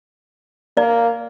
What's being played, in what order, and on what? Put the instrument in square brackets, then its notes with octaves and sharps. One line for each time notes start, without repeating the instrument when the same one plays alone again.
[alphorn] A#3 [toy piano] D5